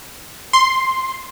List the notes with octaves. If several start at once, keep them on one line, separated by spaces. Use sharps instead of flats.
C6